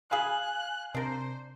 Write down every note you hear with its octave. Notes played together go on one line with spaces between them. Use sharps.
G#4 F5 G#5 B5 F#6
C3 D4 A#4 C5